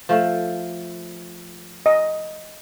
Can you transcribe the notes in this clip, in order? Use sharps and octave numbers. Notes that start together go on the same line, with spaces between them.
F3 A3
D#5